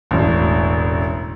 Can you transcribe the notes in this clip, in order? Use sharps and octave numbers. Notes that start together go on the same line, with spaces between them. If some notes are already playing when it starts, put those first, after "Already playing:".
E1 A1